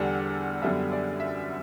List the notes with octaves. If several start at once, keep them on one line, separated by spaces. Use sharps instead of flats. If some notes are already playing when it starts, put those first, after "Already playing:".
Already playing: E2 D3 G3 D4
F#2 D3 G3 B3 E5
D5
E5